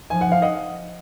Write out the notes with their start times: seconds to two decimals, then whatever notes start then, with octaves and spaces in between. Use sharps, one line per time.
0.10 F3 G#5
0.21 F#5
0.32 F5
0.42 D#5 F#5